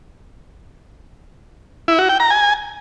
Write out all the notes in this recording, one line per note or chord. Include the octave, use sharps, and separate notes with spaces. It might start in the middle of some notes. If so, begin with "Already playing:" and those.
E4
F#4
G5
A#5
G#5